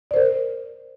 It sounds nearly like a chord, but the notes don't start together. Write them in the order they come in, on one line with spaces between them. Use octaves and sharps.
D5 C5 A#4